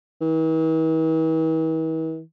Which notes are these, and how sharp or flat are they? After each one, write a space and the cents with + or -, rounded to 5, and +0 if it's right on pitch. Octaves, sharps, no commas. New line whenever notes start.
E3 -45